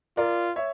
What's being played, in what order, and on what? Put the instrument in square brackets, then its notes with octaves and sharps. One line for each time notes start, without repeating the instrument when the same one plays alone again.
[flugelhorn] F4 [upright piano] A#4 D5
[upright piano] C#5 E5